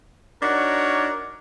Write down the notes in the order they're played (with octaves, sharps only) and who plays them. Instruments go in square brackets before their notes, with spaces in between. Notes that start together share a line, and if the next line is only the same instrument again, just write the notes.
[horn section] D4 D#4 F#4 A#4 C#5